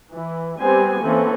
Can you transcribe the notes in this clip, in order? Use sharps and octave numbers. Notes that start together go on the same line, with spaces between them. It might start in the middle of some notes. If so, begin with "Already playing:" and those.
E3
G3 B3 C4 G4 C5 G#5
E3 A#3 C4 C#4 A4